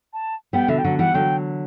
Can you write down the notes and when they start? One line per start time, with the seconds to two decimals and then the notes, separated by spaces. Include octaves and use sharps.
0.13 A5
0.53 G3 B3 G5
0.68 B2 D3 E5
0.78 G5
0.84 D3 F#3 F#5
0.99 E3 G3 F#5
1.14 D3 F#3 G5